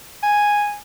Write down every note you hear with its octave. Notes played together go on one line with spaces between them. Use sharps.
G#5